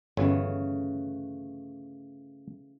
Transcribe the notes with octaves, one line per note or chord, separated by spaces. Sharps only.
G1 C#3 E3 A3